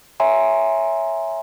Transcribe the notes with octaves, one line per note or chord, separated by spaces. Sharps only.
C#5 E5 G#5 A#5 C6